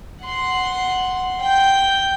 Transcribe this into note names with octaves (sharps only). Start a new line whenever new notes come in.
F#5 C6
G5 G6